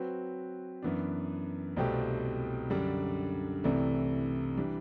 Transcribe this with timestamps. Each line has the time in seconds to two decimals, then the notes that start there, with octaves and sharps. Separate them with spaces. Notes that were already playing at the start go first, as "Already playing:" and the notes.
Already playing: F#3 C4 F#4 B4
0.82 F#2 E3 B3 D4
1.76 C2 B2 A3 C4 G4
2.70 F#2 D3 G3 D4
3.64 C2 C3 E3 A3
4.57 E3 G3 D4